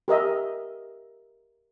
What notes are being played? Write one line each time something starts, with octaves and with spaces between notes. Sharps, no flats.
G4 A#4 D#5 E5